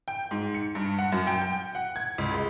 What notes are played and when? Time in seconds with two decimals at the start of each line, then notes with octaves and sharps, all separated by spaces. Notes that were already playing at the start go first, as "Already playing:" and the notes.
0.08 G5
0.31 G#2
0.55 C#7
0.75 G2
0.99 F#5
1.12 F#2
1.27 G5
1.42 G5
1.75 F#5
1.96 G#6
2.18 C#2
2.34 G#3